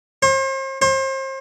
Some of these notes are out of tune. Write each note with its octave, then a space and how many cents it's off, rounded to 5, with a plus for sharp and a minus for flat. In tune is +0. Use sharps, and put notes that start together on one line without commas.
C5 +40
C5 +35